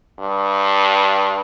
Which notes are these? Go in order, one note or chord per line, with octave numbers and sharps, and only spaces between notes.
G2